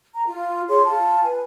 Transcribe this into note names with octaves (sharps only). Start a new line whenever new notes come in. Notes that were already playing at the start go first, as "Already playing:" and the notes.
A#5
F4
G#4 C#5 C6
F4 A5
B4 G#5